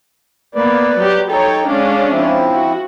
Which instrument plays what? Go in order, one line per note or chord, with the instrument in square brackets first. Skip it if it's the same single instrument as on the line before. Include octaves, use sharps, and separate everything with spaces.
[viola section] A#3 B3 [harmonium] B4 D5
[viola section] F#3 G4
[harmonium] D#4 G5 [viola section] A4 C#5
[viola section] G#3 C#4 D4 [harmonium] F5
[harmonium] F3 C4 E4
[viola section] F#4